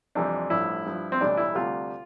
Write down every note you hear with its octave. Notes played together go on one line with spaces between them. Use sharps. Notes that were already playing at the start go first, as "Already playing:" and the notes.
F2 C3 E3 G3 D4
A1 G2 F3 E4
G2 F3
C4
B1 A2 E3 G3 D4
E4
D2 C3 G3 F4